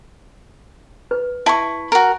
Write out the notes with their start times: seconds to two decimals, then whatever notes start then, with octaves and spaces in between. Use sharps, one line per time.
1.11 B4
1.46 E4 E5 A5 C#6
1.92 F#4 A#4